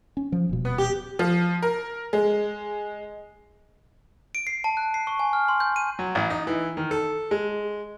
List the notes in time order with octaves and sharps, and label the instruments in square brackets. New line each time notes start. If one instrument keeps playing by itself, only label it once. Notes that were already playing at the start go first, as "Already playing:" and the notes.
[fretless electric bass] C#4
F3
D#1 B2
[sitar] B3
G4
[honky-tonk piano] F3
A#4
G#3
[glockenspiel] D7
C7
A5
F#6
C7
C#6
G#5
F6
C6
G6
D#7
[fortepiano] F#3
A1
D#4
E3
D#3
A4
G#3